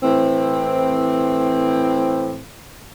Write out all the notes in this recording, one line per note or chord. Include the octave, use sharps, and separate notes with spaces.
A2 E3 C4